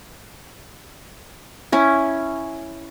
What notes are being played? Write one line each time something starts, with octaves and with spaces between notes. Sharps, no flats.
C#4 E4